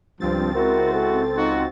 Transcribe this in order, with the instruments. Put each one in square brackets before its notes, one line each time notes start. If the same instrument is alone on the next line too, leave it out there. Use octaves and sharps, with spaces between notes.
[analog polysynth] C#2 C4 A6 [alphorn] G2 [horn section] F3
[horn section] G#3 E4 F#4 [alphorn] A#4
[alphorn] A4
[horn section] D#4 F4 F#4